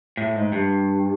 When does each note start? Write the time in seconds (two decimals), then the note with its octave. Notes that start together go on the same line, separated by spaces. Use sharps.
0.17 A2
0.36 G#2
0.52 G2